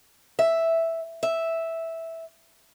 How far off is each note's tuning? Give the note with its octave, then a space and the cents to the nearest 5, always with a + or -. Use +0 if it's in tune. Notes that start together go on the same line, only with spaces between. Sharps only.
E5 +0
E5 -5